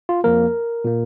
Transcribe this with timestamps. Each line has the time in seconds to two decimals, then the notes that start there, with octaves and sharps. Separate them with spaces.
0.09 F4
0.24 F2 F3 A#3 A#4
0.84 A#2 A#3